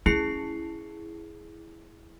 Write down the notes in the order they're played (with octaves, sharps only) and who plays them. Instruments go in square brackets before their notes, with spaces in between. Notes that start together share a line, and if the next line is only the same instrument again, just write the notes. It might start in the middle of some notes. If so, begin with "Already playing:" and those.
[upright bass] C#4 [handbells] E4 G#4 C7